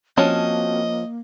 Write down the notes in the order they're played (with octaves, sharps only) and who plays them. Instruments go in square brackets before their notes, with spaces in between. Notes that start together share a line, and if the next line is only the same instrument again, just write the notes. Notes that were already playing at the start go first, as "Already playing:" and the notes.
[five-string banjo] F3 C#4 [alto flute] A#3 [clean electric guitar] C4 F#4 A5 [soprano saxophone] D#5